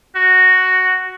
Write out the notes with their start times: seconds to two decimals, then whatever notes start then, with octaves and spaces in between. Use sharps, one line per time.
0.15 F#4